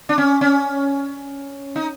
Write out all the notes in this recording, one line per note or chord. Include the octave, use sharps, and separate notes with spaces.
D4
C#4
C#4
D#4